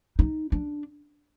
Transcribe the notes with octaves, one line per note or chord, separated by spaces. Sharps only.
D#4
D4